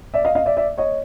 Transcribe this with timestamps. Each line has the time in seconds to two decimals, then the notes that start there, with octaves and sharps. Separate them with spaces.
0.14 D5 E5
0.25 D#5 F5
0.35 D#5 F5
0.46 D5 E5
0.57 D5 E5
0.78 C#5 D#5